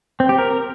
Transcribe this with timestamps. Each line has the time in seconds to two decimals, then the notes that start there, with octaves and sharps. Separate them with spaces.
0.20 C4
0.29 G4
0.38 A#4